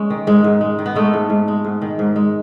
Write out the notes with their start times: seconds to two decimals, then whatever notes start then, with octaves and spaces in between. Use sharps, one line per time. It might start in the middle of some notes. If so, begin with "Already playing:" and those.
Already playing: G#3 C#4
0.10 D#3
0.27 G#2 G#3
0.44 G#2
0.61 G#3
0.79 D#3
0.86 B3
0.95 G#3 A3
1.14 G#2
1.30 G#2
1.48 G#3
1.65 G#2
1.82 D#3
1.99 G#2
2.16 G#3